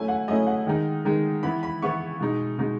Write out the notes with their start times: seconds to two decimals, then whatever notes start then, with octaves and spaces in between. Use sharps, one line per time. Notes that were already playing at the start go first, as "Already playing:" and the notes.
Already playing: F#3 A3 C#4 E4 G#5
0.08 F#5
0.28 F#3 A3 C#4 E4 D#5
0.47 F#5
0.67 D#3 G#3 D#4
1.05 D#3 G#3 D#4
1.43 E3 B3 E4 B5
1.63 B5
1.82 E3 B3 E4 C#6
2.21 B2 G#3 D#4
2.59 B2 G#3 D#4